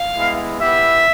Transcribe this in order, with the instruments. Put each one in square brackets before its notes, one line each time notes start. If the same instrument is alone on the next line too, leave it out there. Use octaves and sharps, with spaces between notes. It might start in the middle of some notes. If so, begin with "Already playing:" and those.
Already playing: [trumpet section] F5
G#3 B3 E4
B3 E4 G4 E5